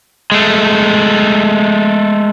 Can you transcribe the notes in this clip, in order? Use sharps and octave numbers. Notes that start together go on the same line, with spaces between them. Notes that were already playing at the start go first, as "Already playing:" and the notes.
G#3 A3